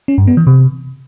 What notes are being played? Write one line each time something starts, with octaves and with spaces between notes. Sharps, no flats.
C#4
G2
B3
E3
C3